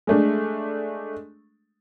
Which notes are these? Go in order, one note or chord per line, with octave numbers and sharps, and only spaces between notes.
G#3 A3 D4